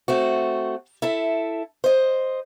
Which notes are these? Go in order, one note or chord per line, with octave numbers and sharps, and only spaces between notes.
A3 C4 F#4
E4 A4 E5
C5 D#5